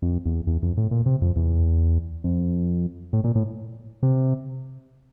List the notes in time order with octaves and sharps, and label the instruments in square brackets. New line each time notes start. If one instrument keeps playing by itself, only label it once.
[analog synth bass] F2
E2
E2
F2
A2
A#2
C3
F2
E2
F2
A2
A#2
A2
C3